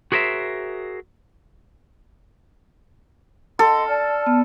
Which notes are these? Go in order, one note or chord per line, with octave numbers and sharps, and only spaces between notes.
F#4 G#4 A#4 C5 E5
A4 D#5 C6
D5 A5 F6
B3